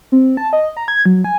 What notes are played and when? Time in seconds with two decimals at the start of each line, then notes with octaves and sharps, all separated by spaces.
0.12 C4
0.37 A5
0.53 D#5
0.77 A#5
0.88 G#6
1.06 F#3
1.24 G#5